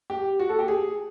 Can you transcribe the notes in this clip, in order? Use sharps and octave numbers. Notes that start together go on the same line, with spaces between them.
G4
F#4
A4
G4
G#4